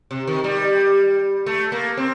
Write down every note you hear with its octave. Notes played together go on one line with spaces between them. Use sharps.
C3
D#3
G3
A3
A#3
C4